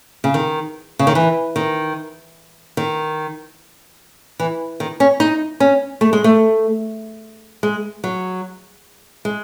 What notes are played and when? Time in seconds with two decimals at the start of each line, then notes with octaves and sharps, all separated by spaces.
0.24 C#3
0.34 D#3
0.99 C#3
1.07 D#3
1.15 E3
1.56 D#3
2.77 D#3
4.39 E3
4.80 D#3
5.00 C#4
5.20 D#4
5.60 C#4
6.01 A3
6.13 G#3
6.24 A3
7.63 G#3
8.04 F#3
9.25 G#3